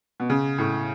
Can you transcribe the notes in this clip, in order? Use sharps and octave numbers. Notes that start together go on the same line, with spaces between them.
B2
C#3
A2